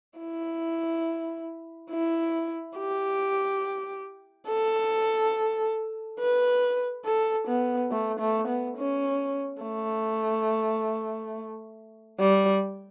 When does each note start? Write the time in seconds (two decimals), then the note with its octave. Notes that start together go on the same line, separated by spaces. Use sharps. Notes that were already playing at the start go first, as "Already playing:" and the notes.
0.19 E4
1.91 E4
2.77 G4
4.48 A4
6.20 B4
7.06 A4
7.48 B3
7.91 A3
8.20 A3
8.48 B3
8.77 C#4
9.63 A3
12.20 G3